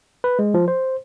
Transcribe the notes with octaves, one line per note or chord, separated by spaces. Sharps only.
B4
G#3
F3
C5